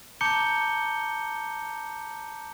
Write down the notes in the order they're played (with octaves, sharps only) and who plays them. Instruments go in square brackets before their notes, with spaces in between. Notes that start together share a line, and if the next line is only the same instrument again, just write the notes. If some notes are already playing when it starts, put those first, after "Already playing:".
[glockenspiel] A5 A#5 D6 G6 C#7 G7